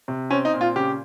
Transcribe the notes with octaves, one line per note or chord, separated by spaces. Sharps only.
C3
C4 C#4
D#4
A#2
F4
C#3 G4